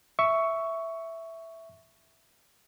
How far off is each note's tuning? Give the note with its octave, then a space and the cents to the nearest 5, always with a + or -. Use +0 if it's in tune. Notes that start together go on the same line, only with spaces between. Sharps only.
E5 +0 C#6 +10